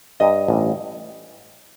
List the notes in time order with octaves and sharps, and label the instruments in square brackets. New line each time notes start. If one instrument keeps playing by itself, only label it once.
[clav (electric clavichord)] G2 [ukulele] D#5
[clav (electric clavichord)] A1